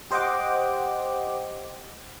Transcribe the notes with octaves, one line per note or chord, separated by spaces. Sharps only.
G4 C5 D#5 F#5 G5 D6